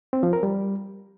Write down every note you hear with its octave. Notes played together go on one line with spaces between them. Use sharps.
C4
F3
A#4
G3